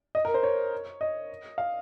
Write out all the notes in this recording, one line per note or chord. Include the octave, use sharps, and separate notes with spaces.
D#5
A#4
C5
C#5
D#5
F5